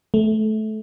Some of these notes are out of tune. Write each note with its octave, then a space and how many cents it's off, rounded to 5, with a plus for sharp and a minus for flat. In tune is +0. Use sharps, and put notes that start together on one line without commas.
A3 -20